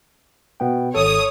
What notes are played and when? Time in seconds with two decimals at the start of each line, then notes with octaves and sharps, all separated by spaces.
0.60 B2 B3 G5
0.94 G#1 A4 C#5 D#6